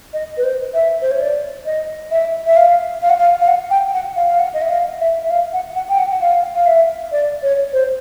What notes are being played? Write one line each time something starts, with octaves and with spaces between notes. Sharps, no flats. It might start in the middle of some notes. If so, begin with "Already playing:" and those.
D#5
B4
C5
E5
C5
C#5
D5
D#5
E5
E5
F5
F5
F#5
F5
F5
F#5
G5
F#5
F5
F5
F#5
D#5
E5
F5
E5
E5
F5
F#5
F#5
G5
F#5
F#5
F5
F5
E5
D5
C#5
C5